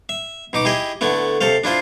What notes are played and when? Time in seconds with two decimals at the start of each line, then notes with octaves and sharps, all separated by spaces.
0.09 E5
0.53 B2 D#4 D6
0.65 E4 G4 G#4 D#5
1.01 D3 A3 B3 E4
1.41 C3 A4 C5 F5
1.64 D4 E4 F4 C5